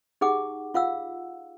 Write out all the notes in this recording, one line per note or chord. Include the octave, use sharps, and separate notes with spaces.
D#4 G4 G#4 F#5 D6
F4 F5 F#5 E6